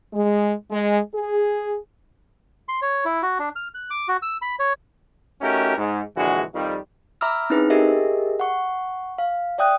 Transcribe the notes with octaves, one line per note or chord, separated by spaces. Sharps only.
G#3
G#3
G#4
C6
C#5
E4
F#4
D4
F6
F#6
D6
F#4
E6
B5
C#5
A3 C#4 D#4 F#4 G4 A#4
G#2
A#1 D3 E3 G#3 F#4
F2 D#3 G3
E5 A#5 B5 D6 E6 F6
C4 C#4 D#4 E4 G#4 B4
G4 G#4 A#4 D#5 E5
F#5 C#6
F5
D5 E5 G5 D#6 F#6